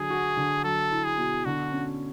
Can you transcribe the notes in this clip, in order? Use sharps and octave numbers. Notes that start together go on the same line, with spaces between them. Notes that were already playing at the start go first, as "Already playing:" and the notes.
Already playing: D3 F#3 G#4
F#4
D3
F#3 A4
E4
G#4
B2
D3 F#4
C#4